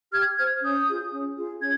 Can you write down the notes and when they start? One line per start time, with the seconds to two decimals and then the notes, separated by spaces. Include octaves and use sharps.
0.12 G4 F6 G#6
0.37 C5 F6 G#6
0.62 C#4 D#6 G6
0.87 F4 G#4
1.12 C#4
1.37 F4 G#4
1.61 C#4 G#6